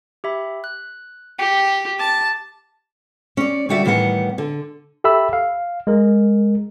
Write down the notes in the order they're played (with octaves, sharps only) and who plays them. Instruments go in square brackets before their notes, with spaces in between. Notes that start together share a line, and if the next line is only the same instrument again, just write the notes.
[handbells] G4 E5 B5
F#6
[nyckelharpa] G4 [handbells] G5 B6 C#7
[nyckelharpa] A5 [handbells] D6
[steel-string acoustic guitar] C#4 D5
D3 G3 F#4 D5 E5
A2 D#3 E3 G3 B3 F#5
D3
[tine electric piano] G4 A4 E5 B5 E6
F5
G#3 A#4